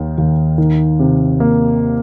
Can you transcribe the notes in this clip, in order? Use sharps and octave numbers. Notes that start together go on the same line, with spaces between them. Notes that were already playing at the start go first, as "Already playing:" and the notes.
Already playing: D#2 D#3
D#2
D#3
C3
A#3